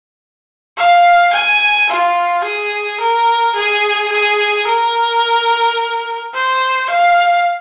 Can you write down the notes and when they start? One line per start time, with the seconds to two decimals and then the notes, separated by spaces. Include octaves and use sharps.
0.78 F5
1.33 G#5
1.89 F4
2.44 G#4
3.00 A#4
3.56 G#4
4.12 G#4
4.68 A#4
6.34 C5
6.90 F5